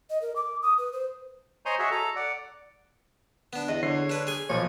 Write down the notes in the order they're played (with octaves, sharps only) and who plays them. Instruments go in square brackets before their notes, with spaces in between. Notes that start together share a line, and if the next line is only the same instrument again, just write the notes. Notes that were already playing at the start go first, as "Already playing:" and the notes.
[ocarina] D#5
A#4
D6
D#6
B4
C5
[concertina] C5 C#5 D#5 G#5 A#5 C6
F#4 G#4 C#5 D#5 E5
A4 A#5
D5 F#5
[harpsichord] B3 D4
[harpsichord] E2 [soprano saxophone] D#5
[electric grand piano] D3 C7 [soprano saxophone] C#5
[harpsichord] D4 B4
G#4 G#5
[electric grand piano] B1 A#2 F3 [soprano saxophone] C#5